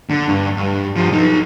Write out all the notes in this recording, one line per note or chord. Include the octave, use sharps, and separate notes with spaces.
D3
G2
G2
F3 G3
B1 D#4